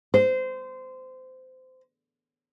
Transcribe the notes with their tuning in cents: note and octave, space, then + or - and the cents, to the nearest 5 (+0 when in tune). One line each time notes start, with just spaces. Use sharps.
C5 -20